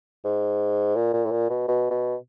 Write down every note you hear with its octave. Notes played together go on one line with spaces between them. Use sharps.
G#2
A#2
A#2
A2
A#2
B2
B2
B2